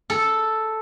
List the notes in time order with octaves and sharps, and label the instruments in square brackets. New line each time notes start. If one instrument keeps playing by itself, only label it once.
[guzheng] A4